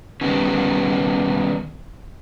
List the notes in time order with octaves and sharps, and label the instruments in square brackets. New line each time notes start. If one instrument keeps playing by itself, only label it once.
[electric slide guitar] D#3 G3 B3 C#4